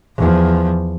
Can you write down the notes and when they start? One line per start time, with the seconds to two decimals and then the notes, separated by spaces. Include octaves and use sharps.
0.17 E2 F3